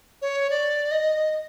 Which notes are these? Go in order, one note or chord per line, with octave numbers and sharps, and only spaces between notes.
C#5
D5
D#5